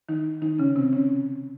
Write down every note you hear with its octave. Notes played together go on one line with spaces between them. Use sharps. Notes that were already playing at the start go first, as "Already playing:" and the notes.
D#3 D#4
D#3 D#4
C#3 C#4
C3 C4
C#3 C#4